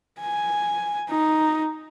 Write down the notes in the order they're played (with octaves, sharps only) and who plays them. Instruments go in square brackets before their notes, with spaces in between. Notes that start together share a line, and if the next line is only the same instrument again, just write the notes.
[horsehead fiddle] G#5
D#4